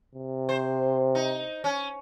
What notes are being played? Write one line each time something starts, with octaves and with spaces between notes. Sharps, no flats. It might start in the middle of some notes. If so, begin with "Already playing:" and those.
C3
C5
D#4
C#4